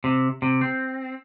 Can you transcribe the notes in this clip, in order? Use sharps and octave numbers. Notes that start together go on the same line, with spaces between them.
C3
C3
C4